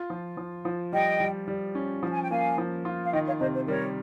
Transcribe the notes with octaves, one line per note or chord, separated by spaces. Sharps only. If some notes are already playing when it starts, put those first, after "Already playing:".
Already playing: F4
F3
F3
F3
G3 D#5 G5
G3
G3
C#4
F3
G#5
G5
A#3 F5 G#5
F3
F4
F5
D#3 D#5 G5
C#5 F5
C3 C5 D#5
C5
G3 A#4 C#5